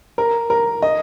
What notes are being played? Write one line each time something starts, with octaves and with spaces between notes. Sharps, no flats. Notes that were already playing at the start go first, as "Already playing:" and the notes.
A#4
A#4
D#5